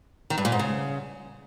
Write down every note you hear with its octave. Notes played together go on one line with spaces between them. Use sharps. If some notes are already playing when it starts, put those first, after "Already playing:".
D#3
G2
A#2
G#2
C#3